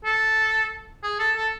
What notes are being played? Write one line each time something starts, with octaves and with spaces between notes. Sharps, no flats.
A4
G#4
A4
A4